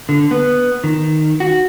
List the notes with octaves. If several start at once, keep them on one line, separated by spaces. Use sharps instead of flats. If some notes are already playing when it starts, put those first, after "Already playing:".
D3
B3
D#3
F#4